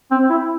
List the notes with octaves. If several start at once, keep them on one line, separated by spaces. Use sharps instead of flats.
C4
E4